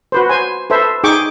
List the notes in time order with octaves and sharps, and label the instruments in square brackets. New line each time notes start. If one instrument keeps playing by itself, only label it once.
[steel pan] F#4 B4 C5
C5 G#5
A4 B4 C5 E5
D#4 G#4 G5 C#6 D6